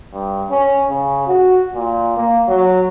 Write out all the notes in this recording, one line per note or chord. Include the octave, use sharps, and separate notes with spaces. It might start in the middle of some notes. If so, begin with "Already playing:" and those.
G2
C#4
C#3
F#4
A#2
A#3
F#3